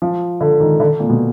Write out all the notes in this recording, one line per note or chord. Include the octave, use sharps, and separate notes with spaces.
F3
D3
D#3
D3
A#2
B2